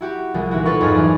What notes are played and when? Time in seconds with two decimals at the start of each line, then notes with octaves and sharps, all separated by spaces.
0.01 E4 F#4 G4
0.34 C2 F3 G#3
0.51 A#2 E3 D#4 E4 F#4
0.65 F4 A4 B4 C#5 F5 C#6
0.81 F2 G#2 C#4 G#4 F6 F#6
0.94 F#2 E3 D#4 D5